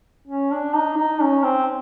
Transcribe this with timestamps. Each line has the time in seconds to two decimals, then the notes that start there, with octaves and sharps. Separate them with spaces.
0.28 C#4
0.52 D4
0.75 D#4
0.97 D#4
1.21 C#4
1.43 C4